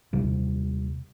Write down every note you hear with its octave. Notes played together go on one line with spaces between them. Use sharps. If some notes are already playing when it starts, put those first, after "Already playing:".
D#2 C3 G3